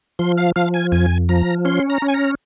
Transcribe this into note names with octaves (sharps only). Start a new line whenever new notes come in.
F3 C6
F5
F3 F5
G#5
F2 G#5
F3 A#5
C#4 C6
A#5
C#4
G#5
A#5